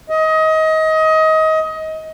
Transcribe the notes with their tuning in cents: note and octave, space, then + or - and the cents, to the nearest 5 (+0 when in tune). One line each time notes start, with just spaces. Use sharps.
D#5 +25